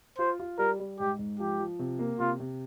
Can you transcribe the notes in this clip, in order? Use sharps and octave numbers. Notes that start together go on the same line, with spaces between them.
F4 C5
F4
G3 A#4
G3
G#2 G4
G#2
F3 G4
F3
C3
A#3
C3 F4
C3